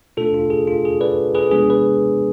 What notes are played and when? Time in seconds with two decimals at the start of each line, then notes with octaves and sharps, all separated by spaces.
0.17 B2 A3 D4 F4 A4
0.34 F4
0.50 G#4
0.67 F4
0.85 G#4
1.01 B4 D5
1.35 G#4 B4
1.51 C3 F3 G#3 B3 D4 G#4
1.70 B4